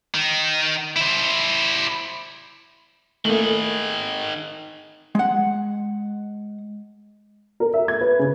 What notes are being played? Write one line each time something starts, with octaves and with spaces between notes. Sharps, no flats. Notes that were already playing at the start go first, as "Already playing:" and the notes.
D#3
E4 C5
D#3 A3 A#3 G#4
G#3 F#5
A#4
E5
G#6
B4
C#3